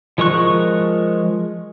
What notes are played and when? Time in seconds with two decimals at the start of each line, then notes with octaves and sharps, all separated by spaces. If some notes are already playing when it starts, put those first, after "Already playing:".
0.18 F3 G#3 A#4 C#6 F#6